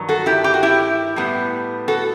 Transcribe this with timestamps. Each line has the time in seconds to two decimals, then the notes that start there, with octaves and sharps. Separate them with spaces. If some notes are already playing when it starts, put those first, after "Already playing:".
Already playing: G2 D#3 F#3
0.09 F#4 A4
0.26 E4 G4
0.44 G4
0.54 F#4
0.63 E4 G4
1.16 A2 G3 B3
1.88 F#4 A4